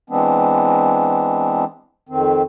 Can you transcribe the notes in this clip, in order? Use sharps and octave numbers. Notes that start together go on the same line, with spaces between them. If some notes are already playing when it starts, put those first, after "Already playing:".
E3 G#3 B3 C4 D4
F2 D#3 C4